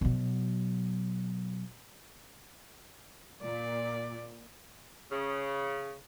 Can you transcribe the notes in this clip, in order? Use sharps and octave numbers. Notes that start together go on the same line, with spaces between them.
B2 F#3
A#2 D5
C#3